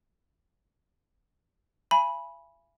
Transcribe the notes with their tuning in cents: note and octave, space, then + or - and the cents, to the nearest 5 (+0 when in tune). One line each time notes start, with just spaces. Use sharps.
E5 +45 G#5 +0 B5 -10